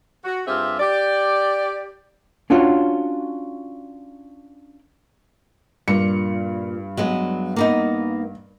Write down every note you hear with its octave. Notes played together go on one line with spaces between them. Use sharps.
F#4
G2 C4 F4 G4 G#4 E5
G4 D5
C#4 D4 F4 F#4 C#5
G2 A#2 C#7
F#3 G#3 B3
A#3 B3 D#4